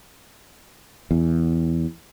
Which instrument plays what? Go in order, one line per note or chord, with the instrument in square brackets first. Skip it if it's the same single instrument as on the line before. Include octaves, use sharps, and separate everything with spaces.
[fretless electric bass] E2